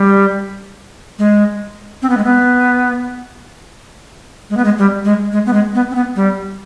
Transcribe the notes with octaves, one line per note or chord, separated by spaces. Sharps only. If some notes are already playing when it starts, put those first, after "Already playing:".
Already playing: G3
G#3
C4
B3
G#3
B3
G#3
B3
G#3
G3
G#3
G#3
B3
G#3
B3
C4
B3
G3